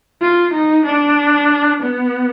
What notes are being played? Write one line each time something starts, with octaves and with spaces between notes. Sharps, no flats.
F4
D#4
D4
B3